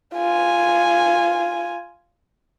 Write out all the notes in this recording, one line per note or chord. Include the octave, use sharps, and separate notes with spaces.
F4 G#5